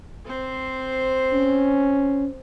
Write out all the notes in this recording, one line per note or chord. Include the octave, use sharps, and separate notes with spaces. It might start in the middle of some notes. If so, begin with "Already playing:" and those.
C4 C5
C#4